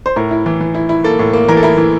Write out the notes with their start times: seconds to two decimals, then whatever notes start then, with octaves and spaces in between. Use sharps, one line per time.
0.06 C5
0.16 A2 A#4
0.31 E4
0.46 E3
0.61 E3
0.75 E4
0.89 E4
1.04 A#3 A4
1.19 A2
1.33 A#3
1.48 E3 A#4
1.57 A4
1.63 E4 A#4
1.77 E3